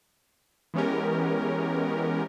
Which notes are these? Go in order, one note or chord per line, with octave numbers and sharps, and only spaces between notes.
E3 G#3 B3 C#4 G4 A#4